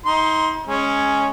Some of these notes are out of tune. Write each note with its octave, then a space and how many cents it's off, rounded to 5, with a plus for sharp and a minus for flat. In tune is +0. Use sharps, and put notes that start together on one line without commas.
D#4 +30 C6 +0
G#3 +5 C#4 +0